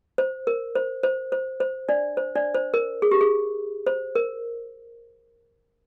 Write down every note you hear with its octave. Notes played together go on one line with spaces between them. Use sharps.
C5
A#4
C5
C5
C5
C5
D4 D5
C5
D4 D5
C5
A#4
G#4
G4
G#4
C5
A#4